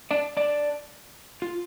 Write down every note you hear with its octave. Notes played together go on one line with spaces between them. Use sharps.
D4 D5
D4 D5
F4